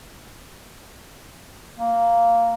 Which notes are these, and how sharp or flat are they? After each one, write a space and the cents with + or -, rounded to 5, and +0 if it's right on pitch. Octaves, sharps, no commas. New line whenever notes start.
A#3 -5